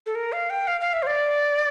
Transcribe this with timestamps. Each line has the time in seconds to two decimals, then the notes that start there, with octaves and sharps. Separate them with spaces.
0.06 A4
0.15 A#4
0.32 F5
0.50 G5
0.67 F5
0.81 F5
0.93 E5
1.03 C5
1.07 D5